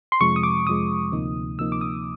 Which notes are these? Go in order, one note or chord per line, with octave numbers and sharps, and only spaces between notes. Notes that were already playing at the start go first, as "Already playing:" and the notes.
C6
F2 C3 F3 G#3 C#6
D#6
D6
F2 C3 F3 G#3 D#6
D2 C3 F3 A#3 D#4
D2 C3 F3 A#3 D#4 E6
D6
D#6